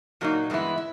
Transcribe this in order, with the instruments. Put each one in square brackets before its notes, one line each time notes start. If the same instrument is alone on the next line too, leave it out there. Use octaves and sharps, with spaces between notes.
[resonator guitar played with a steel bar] A#2 F#3 A#3 D#4
G2 E3 G#3 B3 E4
E4